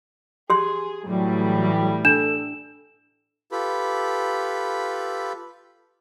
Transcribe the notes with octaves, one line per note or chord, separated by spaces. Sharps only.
G4 G#4 C6
A2 E3 F#3 G3
D4 A4 E7
F4 G4 A4 B4 B5